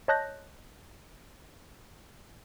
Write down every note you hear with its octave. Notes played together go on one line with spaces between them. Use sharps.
C#5 D#5 A5 F#6 G6 A#6